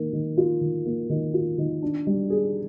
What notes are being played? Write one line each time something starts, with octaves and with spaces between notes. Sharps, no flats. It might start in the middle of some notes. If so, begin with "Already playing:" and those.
Already playing: D#3 A#3
D#3
F4
D#3
A#3
D#3
F4
D#3
D4
G3
G#4